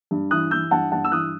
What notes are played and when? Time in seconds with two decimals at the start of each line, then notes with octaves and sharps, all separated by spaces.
0.11 G2
0.31 E3 D#6 F#6
0.51 E3 E6 G6
0.71 G2 F#5 A5
0.92 G2 F#5 A5
1.05 E6
1.12 E3 D#6 F#6